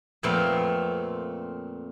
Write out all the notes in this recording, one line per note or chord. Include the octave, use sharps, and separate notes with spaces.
F2 A#2 A3 B3 C4 F5